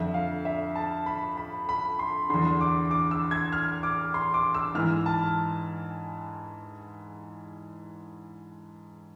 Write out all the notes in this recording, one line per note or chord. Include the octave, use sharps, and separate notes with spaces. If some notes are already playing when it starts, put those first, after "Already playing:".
Already playing: F2 D3 E5
F5
E5
A5
B5
B5
B5
C6
E2 D3 C6
D6
D6
E6
G#6
F6
D6
C6
D6
E6
G#2 E3 F6
A5